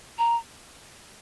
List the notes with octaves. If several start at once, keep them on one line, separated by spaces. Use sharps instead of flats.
A#5